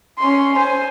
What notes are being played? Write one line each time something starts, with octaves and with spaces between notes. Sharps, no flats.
C#4 C6
C5 G#5